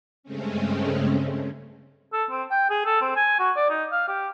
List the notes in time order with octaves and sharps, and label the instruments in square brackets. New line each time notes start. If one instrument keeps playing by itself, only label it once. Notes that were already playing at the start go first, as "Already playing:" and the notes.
[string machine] G2 C#3 G#3 A3 C4 C#4
[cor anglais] A4
C4
G5
G#4
A4
C4
G#5
F#4
D5
D#4
F5
G4